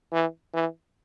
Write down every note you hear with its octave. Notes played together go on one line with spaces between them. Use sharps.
E3
E3